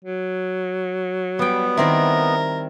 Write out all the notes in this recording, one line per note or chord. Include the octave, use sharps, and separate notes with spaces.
F#3
G3 B3 G5
D#3 C4 E4 A#4